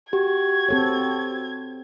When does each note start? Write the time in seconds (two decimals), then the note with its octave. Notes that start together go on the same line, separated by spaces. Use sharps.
0.13 F#4 G4 G#6
0.69 C4 A4 C#5